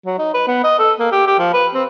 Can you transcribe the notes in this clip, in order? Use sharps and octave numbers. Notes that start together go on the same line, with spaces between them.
F#3
D#4
B4
B3
D#5
A4
A#3
G4
G4
F3
B4
C4